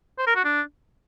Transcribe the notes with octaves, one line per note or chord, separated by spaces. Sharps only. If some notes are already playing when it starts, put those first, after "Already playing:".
C5
A#4
F#4
D4